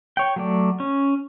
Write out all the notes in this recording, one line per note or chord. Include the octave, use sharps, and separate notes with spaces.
C#5 G5
F#3 A3 D5
C#4